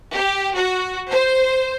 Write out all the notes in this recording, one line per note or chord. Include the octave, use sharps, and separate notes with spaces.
G4
F#4
C5